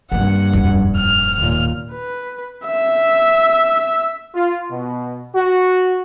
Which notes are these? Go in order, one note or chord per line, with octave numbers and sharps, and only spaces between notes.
G2 D#3 A#3 F#5
D#1 F2
F6
D#2 A#2
B4
E5 E6
F4
B2
F#4